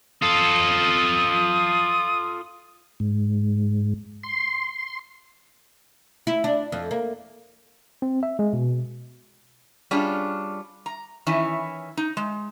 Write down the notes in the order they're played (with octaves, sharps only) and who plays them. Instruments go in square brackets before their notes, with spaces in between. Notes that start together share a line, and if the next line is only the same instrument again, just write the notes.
[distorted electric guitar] F4 A4 [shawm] D#6
[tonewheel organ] G#2
C6
[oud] E4
D4
F2
A#3
[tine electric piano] C4
E5
G#3
B2
[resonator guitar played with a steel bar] G3 C#4 D4 F4 G#4
A#5
D#3 E3 C#4 E4
D#4
G#3